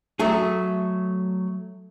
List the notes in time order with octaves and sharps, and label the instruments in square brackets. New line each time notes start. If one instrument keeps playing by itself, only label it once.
[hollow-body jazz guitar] F#3 A3 G#4